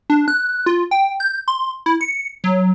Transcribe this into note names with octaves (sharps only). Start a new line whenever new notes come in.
D4
F#6
F4
G5
G6
C6
E4
C#7
F#3